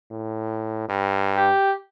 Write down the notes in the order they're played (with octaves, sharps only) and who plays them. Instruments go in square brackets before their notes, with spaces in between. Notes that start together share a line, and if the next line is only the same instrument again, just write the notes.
[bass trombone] A2
G2
[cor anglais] G4